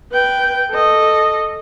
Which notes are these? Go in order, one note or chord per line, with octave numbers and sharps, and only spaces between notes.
B4 G5
A4 D#5